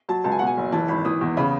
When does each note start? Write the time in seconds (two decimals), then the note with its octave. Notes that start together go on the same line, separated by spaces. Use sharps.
0.09 F#3 A5
0.24 C#2 A5
0.32 G#5
0.39 B2 F#5
0.47 G#5
0.57 F#1
0.72 E3 A5
0.88 G#1 B5
1.05 E3 D#6
1.21 E2
1.37 C#3 B5